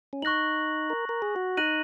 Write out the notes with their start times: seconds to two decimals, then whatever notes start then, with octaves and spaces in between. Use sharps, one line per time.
0.13 C#4
0.22 D#4 C#6 F#6 A#6 F#7
0.90 A#4
1.09 A#4
1.22 G#4
1.36 F#4
1.57 D#4 F#6 A#6 D#7 F#7